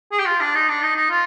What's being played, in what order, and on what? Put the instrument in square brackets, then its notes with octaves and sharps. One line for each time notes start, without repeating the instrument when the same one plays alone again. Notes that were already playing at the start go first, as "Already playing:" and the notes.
[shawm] G#4
G4
F4
D4
D#4
D4
D#4
D#4
F4